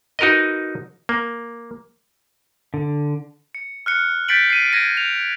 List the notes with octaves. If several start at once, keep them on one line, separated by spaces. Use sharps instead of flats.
D#4 F#4 A#4 B4 D#5
A#3
D3
C#7
F6 F#6 C#7
G6 A6 B6 C#7 D7 F#7
C7 D#7
G#6 A#6 D7 D#7
F7